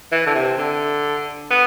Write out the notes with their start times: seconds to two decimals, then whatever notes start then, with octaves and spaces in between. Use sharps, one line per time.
0.12 E3
0.26 D3
0.35 C3
0.58 D3
1.51 B3